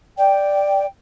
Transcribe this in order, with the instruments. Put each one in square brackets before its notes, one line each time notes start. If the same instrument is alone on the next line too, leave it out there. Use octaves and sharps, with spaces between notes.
[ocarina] D5 [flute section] G5